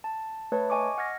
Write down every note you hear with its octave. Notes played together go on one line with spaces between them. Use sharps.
A5
A3 B4 C#5 A5
D#5 G#5 C#6 D6
F#5 F6 G#6 A#6